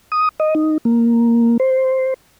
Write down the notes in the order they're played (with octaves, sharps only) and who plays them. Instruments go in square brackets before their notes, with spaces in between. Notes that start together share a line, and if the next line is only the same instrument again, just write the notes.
[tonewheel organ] D#6
D#5
D#4
A#3
C5